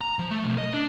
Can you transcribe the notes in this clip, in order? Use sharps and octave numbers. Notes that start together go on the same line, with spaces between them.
A#5
F3
A3
B1
D#5
D4